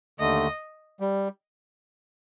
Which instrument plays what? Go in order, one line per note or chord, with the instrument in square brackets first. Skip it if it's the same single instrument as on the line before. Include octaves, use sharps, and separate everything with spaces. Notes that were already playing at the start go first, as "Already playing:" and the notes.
[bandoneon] D#2 D3 A3 [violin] D#5
[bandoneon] G3